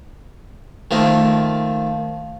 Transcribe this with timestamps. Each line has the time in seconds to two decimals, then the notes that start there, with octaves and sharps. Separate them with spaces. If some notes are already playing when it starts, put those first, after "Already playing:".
0.91 D#3 F3 A3 A#3